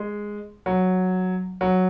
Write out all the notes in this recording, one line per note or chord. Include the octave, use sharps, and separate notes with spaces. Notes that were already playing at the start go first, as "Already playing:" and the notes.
Already playing: G#3
F#3
F#3